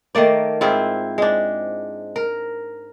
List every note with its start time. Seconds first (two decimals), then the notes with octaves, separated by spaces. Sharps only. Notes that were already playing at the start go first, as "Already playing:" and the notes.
0.15 D#3 A3 A#3 D5
0.61 G#2 C4 E4 F4
1.18 G#3 D4
2.16 A#4